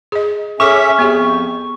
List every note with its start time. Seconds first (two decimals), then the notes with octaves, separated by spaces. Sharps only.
0.12 G#4 D#5
0.60 C#4 G#4 A4 E5 C#6 D6
0.99 F2 B3 G4 G#4